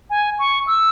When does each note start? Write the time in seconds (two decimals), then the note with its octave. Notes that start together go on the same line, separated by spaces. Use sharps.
0.10 G#5
0.39 C#6
0.67 E6